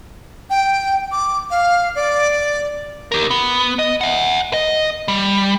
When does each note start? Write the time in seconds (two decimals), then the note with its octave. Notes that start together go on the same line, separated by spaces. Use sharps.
0.50 G5
1.12 D6
1.51 F5
1.95 D5
3.12 G4 A#4
3.30 B3
3.79 D#5
4.01 E5 F#5
4.53 D#5
5.08 G3